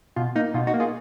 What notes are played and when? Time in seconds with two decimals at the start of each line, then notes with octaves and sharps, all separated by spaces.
0.16 B2 F4
0.35 A#3 D#4
0.54 B2 F4
0.67 D#4 F#4
0.74 A#3
0.80 F4 G#4